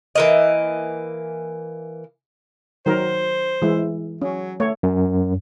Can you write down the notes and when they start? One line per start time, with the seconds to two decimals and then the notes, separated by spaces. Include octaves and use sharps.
0.15 E3 A#3 D#5
2.86 D#3 F#3 A#4 C5
3.62 E3 G#3 E4
4.22 F#3 C#4
4.60 A3 C#5
4.83 F#2